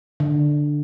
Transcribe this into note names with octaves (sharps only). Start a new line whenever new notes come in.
D3